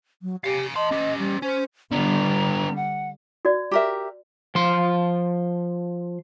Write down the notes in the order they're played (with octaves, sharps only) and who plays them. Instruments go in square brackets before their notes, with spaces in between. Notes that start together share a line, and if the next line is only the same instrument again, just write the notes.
[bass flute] F#3
[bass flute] G4 [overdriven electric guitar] F5 G#5
[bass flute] D#5 [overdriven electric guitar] A5 C6
[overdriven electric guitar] C#4 G4
[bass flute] G3
[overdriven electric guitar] C#4 [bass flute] C5
[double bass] D3 G3 [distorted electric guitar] B3 D4 [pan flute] A#5
[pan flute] F#5
[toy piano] F#4 D5
[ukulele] G4 A#4 E5
[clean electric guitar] F3 C6